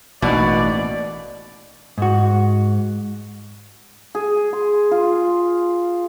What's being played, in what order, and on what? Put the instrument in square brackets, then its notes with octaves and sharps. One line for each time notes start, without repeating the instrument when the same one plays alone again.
[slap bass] A1 [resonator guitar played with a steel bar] B2 [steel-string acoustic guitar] A#3 D4 D#4 [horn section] D5
[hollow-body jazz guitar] G#2 F#4
[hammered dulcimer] G#4
C6
F4